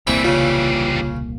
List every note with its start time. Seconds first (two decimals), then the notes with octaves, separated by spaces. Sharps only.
0.07 D#1 C2 E3 G3 A#3 C4 E4 G#4
0.24 C#3 F4 C#5